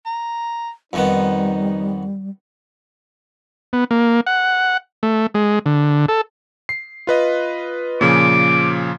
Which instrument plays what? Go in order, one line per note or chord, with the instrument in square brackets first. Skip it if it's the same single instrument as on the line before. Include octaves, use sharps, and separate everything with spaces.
[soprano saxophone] A#5
[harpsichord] F2 D#3 B3 [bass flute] G3 [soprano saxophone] D#4
[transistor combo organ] B3
A#3
F#5
A3
G#3
D3
A4
[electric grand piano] C7
F4 B4 D#5
[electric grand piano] A#2 C#3 F3 [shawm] D6